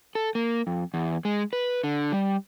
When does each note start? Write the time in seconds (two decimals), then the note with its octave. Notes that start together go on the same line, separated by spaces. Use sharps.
0.15 A4
0.35 A#3
0.67 F2
0.94 E2
1.25 G#3
1.53 B4
1.84 D3
2.12 G3